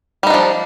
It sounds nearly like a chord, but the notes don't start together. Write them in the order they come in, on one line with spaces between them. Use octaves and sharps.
G3 D#4 D4 F3